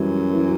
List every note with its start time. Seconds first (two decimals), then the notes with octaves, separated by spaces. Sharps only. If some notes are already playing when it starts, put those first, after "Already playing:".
Already playing: F#2 E3 G3
0.33 E3